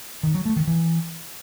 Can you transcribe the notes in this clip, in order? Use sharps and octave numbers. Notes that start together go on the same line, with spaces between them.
D#3
F#3
A3
D#3
E3